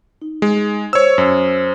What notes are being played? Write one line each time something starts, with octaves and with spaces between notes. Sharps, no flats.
D#4
G#3
C5 C#5 E6
F#2 C5